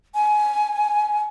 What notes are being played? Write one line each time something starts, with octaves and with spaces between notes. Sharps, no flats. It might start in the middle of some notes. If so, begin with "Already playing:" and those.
G#5